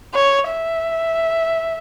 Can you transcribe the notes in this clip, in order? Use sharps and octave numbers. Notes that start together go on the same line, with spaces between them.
C#5
E5